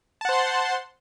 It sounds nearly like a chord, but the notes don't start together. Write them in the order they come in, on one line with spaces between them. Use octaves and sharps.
A5 F#5 C5 C6